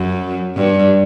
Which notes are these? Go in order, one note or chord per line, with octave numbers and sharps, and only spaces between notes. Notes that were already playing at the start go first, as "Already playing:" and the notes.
Already playing: F#2
G2